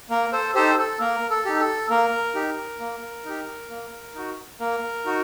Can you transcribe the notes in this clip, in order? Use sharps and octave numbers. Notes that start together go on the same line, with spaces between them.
A#3 A#4
A4 C5
D#4 G4 A4 C5
A4
A#3 A#4
A4
D#4 G4
A4
A#3 A#4
D#4 G4
A#3
D#4 G4
A#3
D#4 F#4
A#3 A#4
D#4 F#4